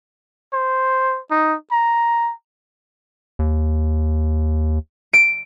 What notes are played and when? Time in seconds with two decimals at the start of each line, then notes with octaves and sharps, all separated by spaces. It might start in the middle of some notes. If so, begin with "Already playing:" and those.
0.53 C5
1.31 D#4
1.72 A#5
3.39 D#2
5.13 D7